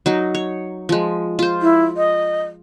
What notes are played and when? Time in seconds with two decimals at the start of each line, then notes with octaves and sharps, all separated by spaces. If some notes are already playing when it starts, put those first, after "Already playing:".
0.06 F#3 D#4
0.35 C#5
0.89 F3 G#3
1.39 F4 C5
1.62 E4
1.97 D#5